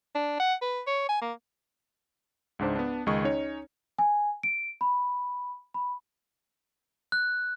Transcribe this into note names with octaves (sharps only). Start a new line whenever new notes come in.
D4
F#5
B4
C#5
G#5
A#3
C#2 G#2 D4 C5
B3 D4
C#2 D#3 G#3 G#4 D#5 C#6
C#4 D#4 C#5
G#5
D7
B5
B5
F#6